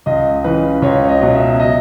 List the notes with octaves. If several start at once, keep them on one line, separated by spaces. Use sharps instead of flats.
C#2 D#5
C#3 E3 B4
C#2 C#5
C#5
D#5
B2 F#3
E5
D#5